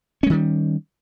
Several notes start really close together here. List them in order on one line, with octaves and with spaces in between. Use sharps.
C#4 G#3 D#3 G3